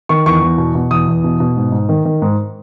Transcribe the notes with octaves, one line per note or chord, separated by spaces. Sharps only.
D#3 C#6
E2 C#6
E2
B2
B2
E2 D#6
E2
B2
B2
G#2
G#2
D#3
D#3
G#2